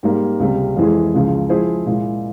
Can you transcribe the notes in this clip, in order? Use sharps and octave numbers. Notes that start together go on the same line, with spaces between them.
G#2 G3 A#3
C#2 C3 G3
F2 E3 G#3 E4 G#4
C#2 C#3 F3 G#3
F3 G#3 E4 G#4 C5
A#2 G#3 E4